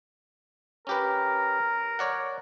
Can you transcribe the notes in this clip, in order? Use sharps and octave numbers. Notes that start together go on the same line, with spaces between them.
C#4 G4 A#4 B4
C#5 D5 F#5